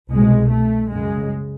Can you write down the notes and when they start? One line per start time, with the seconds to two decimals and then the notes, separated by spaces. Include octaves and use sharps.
0.10 C2 B2 G#3
0.50 A3
0.91 F#2 C#3 G#3